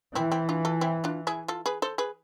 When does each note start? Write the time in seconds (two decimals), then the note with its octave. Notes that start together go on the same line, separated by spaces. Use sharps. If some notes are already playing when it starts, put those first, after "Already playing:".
0.15 E3 C4 E4
0.32 C4 E4
0.49 D4 F4
0.65 F4 A4
0.81 C4 E4
1.04 D4 F4
1.27 E4 G#4
1.48 F4 A4
1.66 G#4 B4
1.82 A4 C5
1.98 G#4 B4